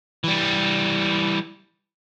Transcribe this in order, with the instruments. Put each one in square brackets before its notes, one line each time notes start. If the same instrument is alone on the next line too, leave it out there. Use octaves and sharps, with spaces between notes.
[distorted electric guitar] E3 G3